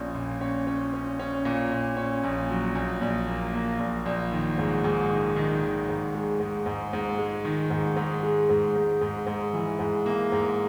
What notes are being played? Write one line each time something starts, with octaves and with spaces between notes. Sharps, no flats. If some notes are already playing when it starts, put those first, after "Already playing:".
Already playing: A#1 C#4
A#2
C#4
C#4
C#4
C#4
A#2
A#2
C#4
A#1
F#3
A#1
A#1
A#3
A#3
A#1
A#1
D#3
G#2
G#2
D#3
D#3
D#3
G#2
G#3
G#2
G#2
G#2
G#3
D#3
G#2
G#2
G#3
G#2
G#2
G#2
G#2
E3
G#2
A#3
G#2